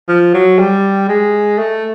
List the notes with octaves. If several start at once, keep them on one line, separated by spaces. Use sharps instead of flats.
F3
F#3
G3
G#3
A3